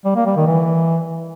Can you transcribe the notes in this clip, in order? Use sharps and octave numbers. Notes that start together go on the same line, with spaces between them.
G3
A#3
G3
D#3
E3